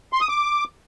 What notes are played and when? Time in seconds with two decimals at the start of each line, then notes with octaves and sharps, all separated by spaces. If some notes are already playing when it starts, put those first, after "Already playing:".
0.13 C6
0.21 D#6
0.29 D6